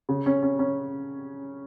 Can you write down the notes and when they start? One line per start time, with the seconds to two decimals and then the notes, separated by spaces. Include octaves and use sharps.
0.09 C#3
0.26 C#4
0.43 C#4
0.59 C#4